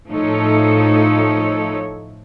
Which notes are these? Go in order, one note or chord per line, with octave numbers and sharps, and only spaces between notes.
A2 F3 A3 D#4 A4 C#5